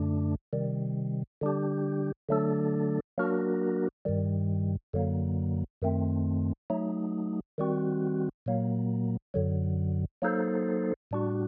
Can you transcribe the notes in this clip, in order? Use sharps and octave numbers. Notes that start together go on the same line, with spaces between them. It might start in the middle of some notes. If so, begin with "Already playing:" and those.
Already playing: F#2 D3 A3 D4
C3 D#3 G3
D3 G3 D4 G4
D3 F#3 A3 D4 A4
F#3 A#3 D4 F#4 A#4
G2 D#3 G3
F#2 D3 F#3 A#3
F#2 D#3 A3 C4
F#3 A3 D#4
D#3 G3 C4 F#4
A#2 F#3 A#3
F#2 D3 F#3
F#3 A#3 D#4 A4 C5
A2 G3 D4 F#4